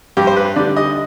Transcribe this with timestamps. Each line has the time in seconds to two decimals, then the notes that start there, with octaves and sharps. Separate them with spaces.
0.17 G2 G4
0.27 C5
0.37 B4
0.56 D3 G3 D5
0.76 D#5